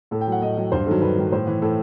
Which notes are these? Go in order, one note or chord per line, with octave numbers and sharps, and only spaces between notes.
A2 A4
G5
F#3 F#5
A2 D#5
F#3
G2 C5
D#3 F#3 A4
G2 B4
D#3 F#3
A2 C5
E3
A2 A4